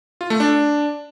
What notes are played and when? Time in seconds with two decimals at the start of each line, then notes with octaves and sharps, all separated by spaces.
0.21 F4
0.30 A3
0.40 D4